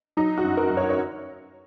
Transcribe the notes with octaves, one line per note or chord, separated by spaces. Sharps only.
F#3 D#4
F#4
F#2
A#4
F#2
C#5
C#5